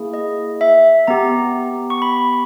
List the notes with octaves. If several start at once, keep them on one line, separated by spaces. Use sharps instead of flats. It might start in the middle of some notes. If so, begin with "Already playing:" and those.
Already playing: A#3 E4 G#4
D#5
E5
B3 G4 A#5
C#6
B5